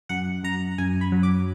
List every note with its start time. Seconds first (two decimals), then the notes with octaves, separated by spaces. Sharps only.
0.09 F#2 F#5
0.43 F#2 A#5
0.78 F#2 G#5
1.01 B5
1.12 F#3
1.23 D6